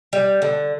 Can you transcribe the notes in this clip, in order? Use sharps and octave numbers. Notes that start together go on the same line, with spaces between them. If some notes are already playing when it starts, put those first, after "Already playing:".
G3
D3